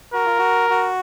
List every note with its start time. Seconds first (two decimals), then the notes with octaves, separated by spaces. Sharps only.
0.14 F#4 A#4
0.26 F4
0.38 F#4
0.70 F#4